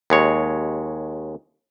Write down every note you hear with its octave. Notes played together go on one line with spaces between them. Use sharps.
D#2 G#3 C#5